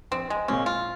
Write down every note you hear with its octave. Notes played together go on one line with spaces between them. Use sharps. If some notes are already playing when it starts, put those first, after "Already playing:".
A#1 C4
G#3
A#2 G#3 C4 C#4
F4